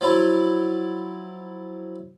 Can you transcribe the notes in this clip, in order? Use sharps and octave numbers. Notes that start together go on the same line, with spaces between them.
F3 F#3 E4